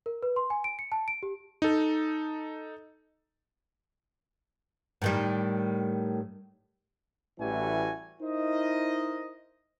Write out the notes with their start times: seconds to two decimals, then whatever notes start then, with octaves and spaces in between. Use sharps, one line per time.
0.06 A#4
0.23 B4
0.36 C6
0.50 G#5
0.64 D7
0.79 C#7
0.92 A5
1.08 D7
1.23 G4
1.62 D#4 A4
5.02 A2 D#3 G3
7.40 A1 E3 G3 A3 F#4 G#5
8.22 D#4 E4 A#4 C5 D#5